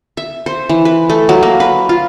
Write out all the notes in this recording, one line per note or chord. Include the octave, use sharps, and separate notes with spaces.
E5
C5
E3
B4
A3
F#3
A#3
B4
F4